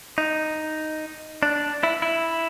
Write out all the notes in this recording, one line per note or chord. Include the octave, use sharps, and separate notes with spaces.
D#4
D4
E4
E4